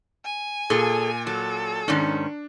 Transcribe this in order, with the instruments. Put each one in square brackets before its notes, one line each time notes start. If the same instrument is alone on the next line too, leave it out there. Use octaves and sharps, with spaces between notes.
[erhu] G#5
[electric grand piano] A#2 [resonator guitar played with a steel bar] G#4 A4
[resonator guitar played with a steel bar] F#3 [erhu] A4
[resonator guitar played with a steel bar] G#2 D#3 C#4 [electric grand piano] D4